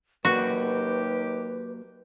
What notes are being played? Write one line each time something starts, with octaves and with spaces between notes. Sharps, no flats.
D#2 D#3 F#3 A#3 F#4 G4 B4 D5